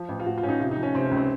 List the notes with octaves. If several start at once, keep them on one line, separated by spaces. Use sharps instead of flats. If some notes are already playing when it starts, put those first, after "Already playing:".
Already playing: F3
A1
F4
A1 F#4
F4
A1 C#4
D#4
C3 F4
D#4
F3
C#4
C3 C4
C#4
C#2
C4